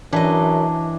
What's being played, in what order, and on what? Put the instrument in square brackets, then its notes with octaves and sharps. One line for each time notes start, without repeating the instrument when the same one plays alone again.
[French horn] F#2 [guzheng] E3 D#5 [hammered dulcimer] D4